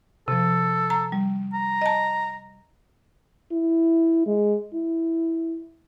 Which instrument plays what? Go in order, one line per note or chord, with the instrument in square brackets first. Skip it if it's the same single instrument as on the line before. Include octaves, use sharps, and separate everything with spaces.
[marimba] C3 F3 [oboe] A4
[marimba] A#5
G3
[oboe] A#5
[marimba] D#5 A5
[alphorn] E4
G#3
E4